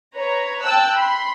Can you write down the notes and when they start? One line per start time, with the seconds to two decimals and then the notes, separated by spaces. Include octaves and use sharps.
0.15 B4 C#5 A#5
0.64 G5 A5 E6 F#6
0.97 B5 C6